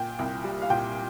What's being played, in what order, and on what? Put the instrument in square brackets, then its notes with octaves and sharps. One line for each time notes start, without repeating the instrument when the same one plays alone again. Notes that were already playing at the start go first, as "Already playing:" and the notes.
Already playing: [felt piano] A#2 [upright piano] G5
[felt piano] C2
G3
[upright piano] F5
[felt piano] A#2 [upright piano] G5